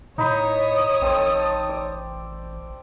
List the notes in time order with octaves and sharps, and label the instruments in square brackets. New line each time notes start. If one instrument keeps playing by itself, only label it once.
[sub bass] A2 [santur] D#4 B5 [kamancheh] C#5 D#6
[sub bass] A1 [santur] C4 A4
[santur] D5